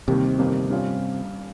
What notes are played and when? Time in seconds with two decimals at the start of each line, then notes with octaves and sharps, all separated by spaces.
0.08 D#2 C3 D#3 G3 C4
0.39 G1 F2 D#3 G3 A#3
0.70 G2 G3 C#4 F4